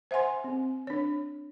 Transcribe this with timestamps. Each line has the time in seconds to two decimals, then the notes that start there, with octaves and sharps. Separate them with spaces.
0.11 C5 E5 F#5 G#5 C6
0.44 C4
0.87 D4 C#5